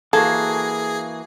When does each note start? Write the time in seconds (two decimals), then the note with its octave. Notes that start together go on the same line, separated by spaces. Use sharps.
0.13 E3 A#3 F#4 G#4 A4 F5 G#6